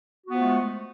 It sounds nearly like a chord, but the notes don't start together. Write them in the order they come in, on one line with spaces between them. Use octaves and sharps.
F#4 B3 F3 A3 G#3